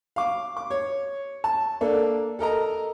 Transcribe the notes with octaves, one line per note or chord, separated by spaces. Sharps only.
F5 D6
D6
C#5
A5
A#3 D4 A4
A4 A#4 D#5 A#5